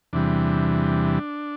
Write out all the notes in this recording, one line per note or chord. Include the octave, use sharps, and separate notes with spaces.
E2 C3 E3 G3 D4